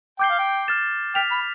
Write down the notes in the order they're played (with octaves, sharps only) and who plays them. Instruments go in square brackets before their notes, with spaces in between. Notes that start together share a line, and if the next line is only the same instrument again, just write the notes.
[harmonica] G5 [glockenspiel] D6 G6 C7 G7
[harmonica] F5
G5
[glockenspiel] F6 A6 E7
[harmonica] G5 [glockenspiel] F6 B6 F7
[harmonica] B5